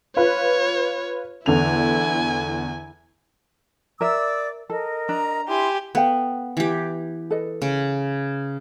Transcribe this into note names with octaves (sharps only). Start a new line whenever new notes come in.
F4 B4 C#5
E2 D3 E4 G#5 F7
A#4 D5 E5 D6 E6
A4 A#4 D#5
D4 A#5
E4 G4 G#5 C6
B3 A4 F5 G5
E3 G4
A4 B4 D#5
C#3